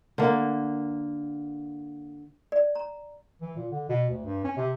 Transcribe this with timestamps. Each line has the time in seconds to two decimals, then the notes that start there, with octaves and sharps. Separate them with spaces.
0.18 D3 A#3
2.52 D5
2.75 A#5
3.42 E3
3.56 A#2
3.71 D3
3.89 B2
4.09 D2
4.24 G2
4.44 C#4
4.57 C3